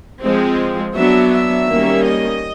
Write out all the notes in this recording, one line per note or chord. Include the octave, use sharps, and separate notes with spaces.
F3 G#3 C4
F#3 B3 D4 E5
E5
D#3 G3 A#3 C#4
D#5